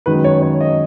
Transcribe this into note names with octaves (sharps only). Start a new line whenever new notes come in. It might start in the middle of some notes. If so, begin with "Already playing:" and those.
F#2 D#3 G#3 B4
C#5
C#5
D#5